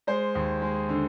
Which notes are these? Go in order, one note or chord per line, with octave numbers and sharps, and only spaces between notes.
G#3 C5
D#2
G#3
D3